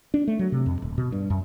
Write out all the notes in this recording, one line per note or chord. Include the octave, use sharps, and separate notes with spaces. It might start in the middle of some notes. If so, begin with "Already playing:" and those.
D4
A3
F#3
C3
F2
D#1
B2
G2
F#2